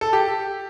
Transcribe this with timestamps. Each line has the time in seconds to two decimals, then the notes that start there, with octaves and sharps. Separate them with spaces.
0.01 A4
0.13 G4